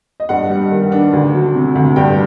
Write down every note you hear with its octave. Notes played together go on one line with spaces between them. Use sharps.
D#5
G2 F#5
G3
D#3
D4
D2
F#3
C3
D2
G2 G5